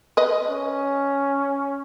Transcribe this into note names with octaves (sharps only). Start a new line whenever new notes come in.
B4 D#5
C#4